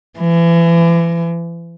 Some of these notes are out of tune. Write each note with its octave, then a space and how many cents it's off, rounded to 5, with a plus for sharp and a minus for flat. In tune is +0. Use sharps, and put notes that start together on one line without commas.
E3 +35